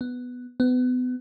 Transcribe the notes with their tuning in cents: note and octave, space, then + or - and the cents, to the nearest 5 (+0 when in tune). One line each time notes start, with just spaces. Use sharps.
B3 +5
B3 +30